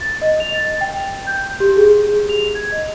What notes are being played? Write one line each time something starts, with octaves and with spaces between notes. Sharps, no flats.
A6
D#5
F7
A6
G5
G6
G4
G#4
F7
G#6
D#5